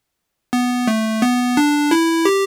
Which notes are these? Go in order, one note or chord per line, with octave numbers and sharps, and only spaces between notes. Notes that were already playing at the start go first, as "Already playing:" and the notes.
B3
A3
B3
D4
E4
G4